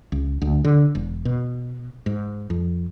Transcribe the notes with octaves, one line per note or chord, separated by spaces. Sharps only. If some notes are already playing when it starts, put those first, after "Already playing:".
C#2
D2
D3
E1
B2
G#2
F2